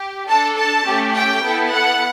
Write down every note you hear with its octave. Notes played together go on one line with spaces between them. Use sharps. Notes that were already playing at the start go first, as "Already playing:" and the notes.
Already playing: G4
D4 A4 A5
A5
A3 C#4 G4
G5
B3 E4 A4
F#5